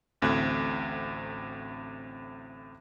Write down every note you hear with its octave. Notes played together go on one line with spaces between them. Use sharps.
A1 D2 A2 C4 F#6 G#6